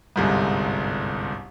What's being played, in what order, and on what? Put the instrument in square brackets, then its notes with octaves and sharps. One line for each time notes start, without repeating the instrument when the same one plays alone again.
[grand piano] G1 C2 G#2